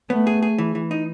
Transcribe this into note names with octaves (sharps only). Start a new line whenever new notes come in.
A3 B3
G#4
G#4
E3
E3
D#4